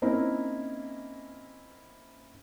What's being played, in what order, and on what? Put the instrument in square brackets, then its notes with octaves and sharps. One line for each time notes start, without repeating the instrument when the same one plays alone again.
[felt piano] A#3 C4 C#4 D#4 E4 A#4